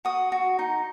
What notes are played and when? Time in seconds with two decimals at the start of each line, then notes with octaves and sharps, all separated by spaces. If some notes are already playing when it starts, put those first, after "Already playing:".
0.05 F#4 D#6
0.32 F#4
0.59 D#4